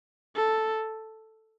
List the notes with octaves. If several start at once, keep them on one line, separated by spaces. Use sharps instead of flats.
A4